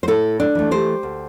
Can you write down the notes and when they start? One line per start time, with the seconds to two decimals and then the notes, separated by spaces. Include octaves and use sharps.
0.03 C5
0.08 A2 E4 A4
0.40 D4
0.55 E3 A3
0.71 G4 C5
1.03 D2